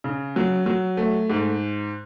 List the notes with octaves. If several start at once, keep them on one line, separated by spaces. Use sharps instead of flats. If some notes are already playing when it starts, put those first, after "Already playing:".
C#3
F#3
F#3
A3
G#2